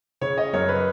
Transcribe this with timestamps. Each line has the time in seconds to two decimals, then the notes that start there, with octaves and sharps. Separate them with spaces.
0.21 C#3 C#5
0.38 D#5
0.53 F#2 C#5
0.69 B4